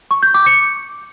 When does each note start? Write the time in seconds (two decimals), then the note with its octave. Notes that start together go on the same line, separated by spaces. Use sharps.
0.11 C#6
0.23 G6
0.34 D6
0.46 C#7